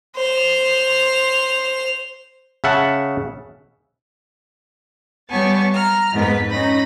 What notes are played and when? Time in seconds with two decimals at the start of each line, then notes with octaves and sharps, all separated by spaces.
0.16 C5 F7
2.64 C#3 E5 F#5 A5
5.29 G3 B3 C#5 G#5 A5 C#6
5.73 A#5 F6
6.11 F2 G#2 B3 B4
6.50 C#4 D#4 B5 A#6